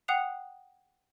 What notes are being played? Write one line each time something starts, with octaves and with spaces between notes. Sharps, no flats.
F#5 G5 D#6 F#6 C7 F7